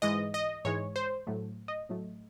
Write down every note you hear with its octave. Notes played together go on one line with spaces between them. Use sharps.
G#2 E3 G#3 D#5
D#5
G#2 E3 G#3 C#5
C5
A2 F#3 A3
D#5
A2 F#3 A3